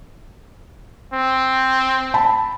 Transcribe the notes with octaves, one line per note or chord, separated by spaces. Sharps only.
C4
A5 B5